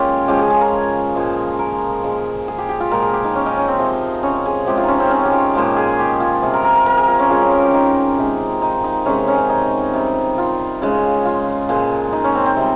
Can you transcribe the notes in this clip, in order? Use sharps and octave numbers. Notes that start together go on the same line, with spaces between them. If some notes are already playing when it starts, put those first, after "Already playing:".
Already playing: A#2 G#3 C#4 F4 G4
C#3 F3 G#3 G4
G#4
G#4
A#4
A#2 F3 G#3
A#4
A#2 F3 G#3
G#4
G4
G4
F4
A#2 F3 G#3 A#4
G#4
G4
D#4
C#4
D#4
C#4
C4
C3 F3 G#3
C#4
G#4
C3 F3 G#3 G4
F4
C#4 D#4
C4
C#4
G4
F4
A#2 F3 G#3 G4
G#4
G4
F4
C3 G3 G#4
A#4
A#4
A#4
A#4
G#4
F4
C#4
C#3 G#3 F4
G4
A#4
G4
D#4
C3 D#3 G#3
D#4
D#4
C3 D#3 G#3 C#4
C#4
D#4
C3 G3
F4
C#3 G#3
F4
A#2 F3 G#3
D#4
C#4
C4
C4
C3 G3